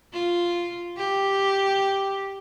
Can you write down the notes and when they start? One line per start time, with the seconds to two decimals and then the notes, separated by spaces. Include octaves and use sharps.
0.13 F4
0.97 G4